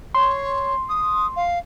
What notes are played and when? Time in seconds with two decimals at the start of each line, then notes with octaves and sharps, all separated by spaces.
0.15 C#5 C6
0.89 D#6
1.36 F5